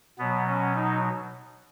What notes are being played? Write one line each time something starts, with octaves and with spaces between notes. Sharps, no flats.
B2 F#3 B3
C#4
D#4